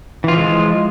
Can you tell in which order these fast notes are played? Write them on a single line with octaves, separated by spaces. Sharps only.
E3 F4 F3 G#3